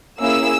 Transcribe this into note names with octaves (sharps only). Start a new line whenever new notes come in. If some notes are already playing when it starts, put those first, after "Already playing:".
A#3 C#4 E4 G#4 E6